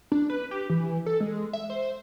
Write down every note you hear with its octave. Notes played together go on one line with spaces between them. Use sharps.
D4
B4
G4
E3
A4
G#3
E5
C5